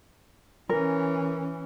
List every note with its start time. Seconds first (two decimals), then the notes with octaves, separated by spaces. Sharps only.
0.69 E3 C#4 A#4